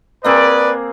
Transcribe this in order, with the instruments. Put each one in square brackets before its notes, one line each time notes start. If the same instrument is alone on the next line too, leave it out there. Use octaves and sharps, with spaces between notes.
[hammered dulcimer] A#3 C4 G#4 [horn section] B4 D5